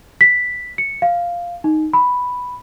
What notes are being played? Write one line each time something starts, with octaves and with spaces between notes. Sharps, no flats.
B6
C#7
F5
D#4
B5